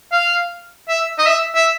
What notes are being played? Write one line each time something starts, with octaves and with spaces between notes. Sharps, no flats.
F5
E5
D#5
E5
E5